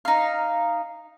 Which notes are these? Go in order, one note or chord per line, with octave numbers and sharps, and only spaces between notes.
D#4 F5